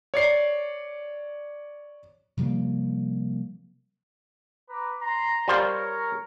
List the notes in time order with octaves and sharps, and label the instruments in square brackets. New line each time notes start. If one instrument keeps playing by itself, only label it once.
[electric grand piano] C#5 D5 C7
[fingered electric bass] C3 F3 G3 A#3
[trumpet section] B4 A#5 D6
A#5 C6
[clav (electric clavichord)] G3 F4 C5 [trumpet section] A#4 C#5